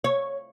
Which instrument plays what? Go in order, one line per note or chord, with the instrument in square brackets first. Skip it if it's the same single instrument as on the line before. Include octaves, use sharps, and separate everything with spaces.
[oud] C#5